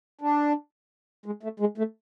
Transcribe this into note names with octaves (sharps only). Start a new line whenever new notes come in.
D4
G#3
A3
G#3
A3